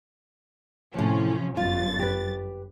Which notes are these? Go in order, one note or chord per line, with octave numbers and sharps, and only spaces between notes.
D#2 A2 C3 F3 C#4
G1 F#2 F4 A6
G4 B4